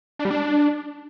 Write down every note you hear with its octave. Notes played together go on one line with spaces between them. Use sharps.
D4
G3
D4